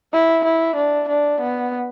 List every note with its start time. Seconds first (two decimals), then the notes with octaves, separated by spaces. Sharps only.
0.13 E4
0.44 E4
0.76 D4
1.09 D4
1.41 B3